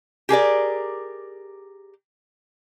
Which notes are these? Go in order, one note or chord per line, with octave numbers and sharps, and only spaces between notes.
G4 G#4 A#4 D5